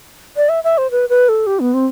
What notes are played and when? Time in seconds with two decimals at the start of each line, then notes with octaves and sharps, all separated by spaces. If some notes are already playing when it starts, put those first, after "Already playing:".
0.36 D5
0.49 E5
0.64 E5
0.78 C5
0.91 B4
1.09 B4
1.29 A4
1.47 G4
1.60 B3
1.74 C4